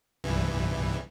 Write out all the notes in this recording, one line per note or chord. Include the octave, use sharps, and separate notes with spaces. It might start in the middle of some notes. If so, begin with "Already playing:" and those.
C2 G2 E3